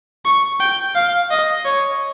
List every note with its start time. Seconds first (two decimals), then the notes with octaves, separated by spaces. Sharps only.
0.25 C#6
0.60 G5
0.95 F5
1.31 D#5
1.65 C#5